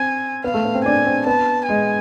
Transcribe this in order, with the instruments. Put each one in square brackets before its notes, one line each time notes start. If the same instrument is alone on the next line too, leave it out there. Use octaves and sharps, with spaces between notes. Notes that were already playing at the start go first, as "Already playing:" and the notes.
Already playing: [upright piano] C4 [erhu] G#5
[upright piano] B3 [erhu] F5
[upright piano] A3
B3
C4
[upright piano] D4 [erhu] G#5
[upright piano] C4
[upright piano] B3 [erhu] A5
[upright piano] G#3 [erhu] G#5